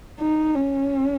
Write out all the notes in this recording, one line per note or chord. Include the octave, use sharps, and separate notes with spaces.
D#4
C#4